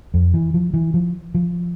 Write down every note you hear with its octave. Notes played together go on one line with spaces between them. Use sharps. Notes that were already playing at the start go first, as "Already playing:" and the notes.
F2
E3
F3
E3
F3
F3